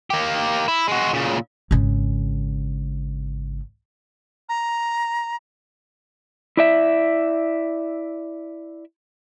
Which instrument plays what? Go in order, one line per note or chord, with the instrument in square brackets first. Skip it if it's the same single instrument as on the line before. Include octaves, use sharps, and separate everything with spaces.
[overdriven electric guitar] A#3 G4
E4
G#3 F#4
A#2 C#3
[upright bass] G#1 C#3
[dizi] A#5
[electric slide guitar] E4 D5 E5